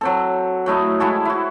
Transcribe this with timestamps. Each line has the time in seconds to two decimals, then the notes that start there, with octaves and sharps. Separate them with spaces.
0.01 F#3 C4 A4
0.66 F#3 A3 E4 D#5
1.00 G#3 E4 F#4 A4
1.25 E4 F#4